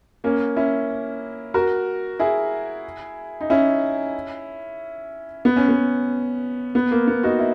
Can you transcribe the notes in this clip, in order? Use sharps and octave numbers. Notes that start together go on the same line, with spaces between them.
A#3 C#4
C#4 E4
F#4 A#4
E4 G#4
D#4
C#4 E4
B3
C#4
B3
B3
A#3
B3
D#4 F#4
E4